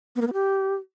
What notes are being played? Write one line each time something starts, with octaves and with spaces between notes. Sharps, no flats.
B3
A#3
B3
G4